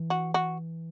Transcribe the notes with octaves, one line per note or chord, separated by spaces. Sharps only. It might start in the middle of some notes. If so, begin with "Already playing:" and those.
Already playing: E3
F#4
F#4